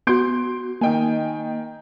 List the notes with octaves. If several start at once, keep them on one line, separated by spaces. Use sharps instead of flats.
B3 F#4 C6 G6 D7
D#3 A#3 D#5 G5 G#5